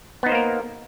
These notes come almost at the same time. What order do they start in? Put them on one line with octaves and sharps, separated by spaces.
B3 D#4 C5 A#3 A#4